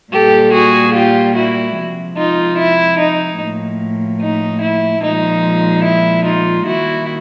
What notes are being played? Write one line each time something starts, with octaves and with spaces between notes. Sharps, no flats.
A#2 G3 A#3 G4 A4
F#4 G#4
F4 G4
E4 F#4
C3 F3 G#3
D#4 F4
E4
D#4
A2 F3 A#3
D#4
E4
A#2 F3 G#3 D#4
E4
D#4 F4
D#3 G3 A#3 E4 F#4